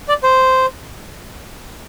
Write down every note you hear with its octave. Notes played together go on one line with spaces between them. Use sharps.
D5
C5